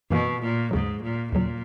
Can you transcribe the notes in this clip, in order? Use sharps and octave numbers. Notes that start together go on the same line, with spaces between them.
F#2 B2 E3 A#3
A#2
D#2 G#2 C#3 F#3
A#2
D#2 A#2 C#3 F#3